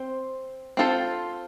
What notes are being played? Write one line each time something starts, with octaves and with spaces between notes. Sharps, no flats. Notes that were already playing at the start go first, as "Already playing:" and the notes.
Already playing: C4 C5
C4 F4 A4 C5